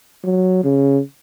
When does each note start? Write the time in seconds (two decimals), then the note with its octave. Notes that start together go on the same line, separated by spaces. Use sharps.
0.24 F#3
0.64 C#3